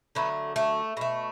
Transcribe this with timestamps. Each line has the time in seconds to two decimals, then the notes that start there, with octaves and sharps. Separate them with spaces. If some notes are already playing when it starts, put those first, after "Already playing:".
0.15 D3 F#3 A3 B3
0.56 A3
0.97 B2 A3